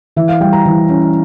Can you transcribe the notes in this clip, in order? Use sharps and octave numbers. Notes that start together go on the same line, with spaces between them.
E3 E5
F5
G3 G5
A#5
E3
C#4